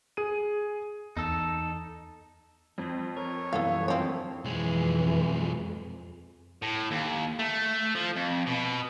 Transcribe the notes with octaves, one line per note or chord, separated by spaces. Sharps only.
G#4 D#7
E2 D#4 A4
F2 C4
A#4 C#5
F#2 B2 E3 G3 B3 E4 A4 F5
F2 D3 F3 A3 C4 C#5
B1 F2 E3 G#3
A2
D#2
A3
F3
F2
B2